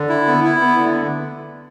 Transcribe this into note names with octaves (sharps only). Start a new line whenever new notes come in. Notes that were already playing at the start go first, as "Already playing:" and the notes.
Already playing: D3
E4
B3
E4
B3
D3